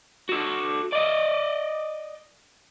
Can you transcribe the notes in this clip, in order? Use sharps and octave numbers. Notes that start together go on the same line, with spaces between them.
F#4 A4
D5 D#5